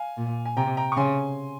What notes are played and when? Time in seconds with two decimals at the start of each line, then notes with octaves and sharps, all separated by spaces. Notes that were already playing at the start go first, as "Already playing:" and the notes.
Already playing: F5 G#5
0.17 A#2
0.45 G#5
0.57 C3 G5 A#5
0.77 G5 A#5
0.92 C#6
0.97 C#3 G#5 C6